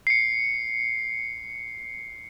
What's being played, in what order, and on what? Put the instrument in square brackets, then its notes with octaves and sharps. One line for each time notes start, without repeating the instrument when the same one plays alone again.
[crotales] C7 C#7